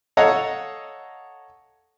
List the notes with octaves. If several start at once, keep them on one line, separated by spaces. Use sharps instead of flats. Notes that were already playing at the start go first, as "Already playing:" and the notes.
A4 C#5 D#5 F5 F#5 A#5